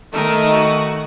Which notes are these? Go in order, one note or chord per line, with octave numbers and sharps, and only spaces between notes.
D#3 A3 D#4 A#4
F#4